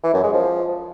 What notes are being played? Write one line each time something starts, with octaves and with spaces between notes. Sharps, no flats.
E3
F#2
G#3
F3